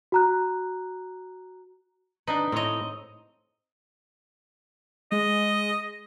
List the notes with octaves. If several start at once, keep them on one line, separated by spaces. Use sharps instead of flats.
F#4 A#5 F#6
D4 D#4 B4
A2 C4 C#5 D#5
G#3 D#5